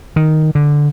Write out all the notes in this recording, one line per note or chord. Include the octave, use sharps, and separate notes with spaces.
D#3
D3